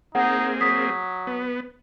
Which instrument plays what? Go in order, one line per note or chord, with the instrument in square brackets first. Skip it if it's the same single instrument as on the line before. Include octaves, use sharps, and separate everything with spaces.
[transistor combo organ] A#3 C4 G#4 [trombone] D#4 [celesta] F#5
[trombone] F#3 [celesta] D#6 B6
[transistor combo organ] B3